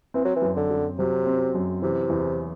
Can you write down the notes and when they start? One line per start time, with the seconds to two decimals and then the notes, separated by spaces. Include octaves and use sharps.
0.14 E3 C4
0.25 F#3
0.36 E3
0.42 F#2
0.56 D3
0.70 F#2
0.99 C3 F#3
1.27 C4
1.55 F#2
1.82 C3 E3
2.10 E2